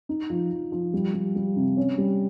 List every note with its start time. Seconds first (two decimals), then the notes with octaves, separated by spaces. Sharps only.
0.09 D#4
0.30 F3
0.51 F3
0.72 F3
0.94 G3
1.14 G3
1.36 G3
1.56 C3
1.77 C#4
1.98 G3